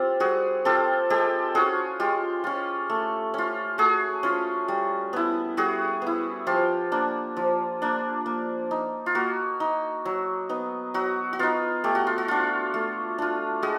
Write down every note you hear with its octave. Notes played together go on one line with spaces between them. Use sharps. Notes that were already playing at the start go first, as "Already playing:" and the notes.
Already playing: C4 F4 G4
G3 F#4 G#4
C4 F4 G4 A4
G#3 G4 A4
C#4 F4 F#4 G#4
G#3 F4 G4
C#4 F4
A3
C#4 F4
A3 F#4 G#4
C#4 F4
G3
B3 E4
G3 F#4 G#4
B3 E4
F3 F4 G4
A#3 D4
F3
A#3 D4
A#3
D#4
F4
A#3 F#4
D#4
F#3
B3 D#4
F#3 F#4
F#4
B3 D#4 F4
A3 G4
F#4
F4
F#4
D4 F4
A3
D4 F4
G#3 F#4 G#4